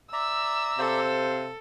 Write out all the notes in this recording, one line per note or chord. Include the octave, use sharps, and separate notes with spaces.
D5 E5 A#5 E6
C3 A4 C5 F5